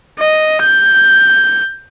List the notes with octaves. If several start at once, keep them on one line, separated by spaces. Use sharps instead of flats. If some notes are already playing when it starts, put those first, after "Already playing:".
D#5
G6